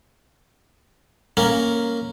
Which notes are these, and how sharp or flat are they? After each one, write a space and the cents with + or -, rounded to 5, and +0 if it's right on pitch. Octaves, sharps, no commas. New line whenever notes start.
A#3 +0 C#4 +0